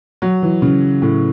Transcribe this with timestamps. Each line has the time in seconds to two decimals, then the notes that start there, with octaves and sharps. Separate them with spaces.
0.22 F#3
0.42 E3
0.62 C#3
1.02 A2